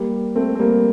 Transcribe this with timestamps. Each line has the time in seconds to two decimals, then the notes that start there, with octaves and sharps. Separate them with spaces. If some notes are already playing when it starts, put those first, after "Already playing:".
Already playing: G3 A#3
0.36 A3 C4
0.55 C4
0.59 G3 A#3